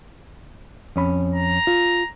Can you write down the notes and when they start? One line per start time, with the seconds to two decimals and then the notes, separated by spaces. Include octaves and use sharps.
0.96 F2 C#4 B5
1.35 A#5
1.67 F4